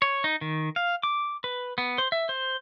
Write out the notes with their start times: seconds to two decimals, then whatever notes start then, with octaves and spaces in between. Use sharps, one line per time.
0.02 C#5
0.24 D#4
0.41 D#3
0.76 F5
1.03 D6
1.44 B4
1.78 B3
1.98 C5
2.12 E5
2.29 C5